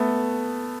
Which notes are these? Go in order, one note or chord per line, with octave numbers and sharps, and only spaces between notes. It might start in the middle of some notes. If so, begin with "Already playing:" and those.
Already playing: A3 B3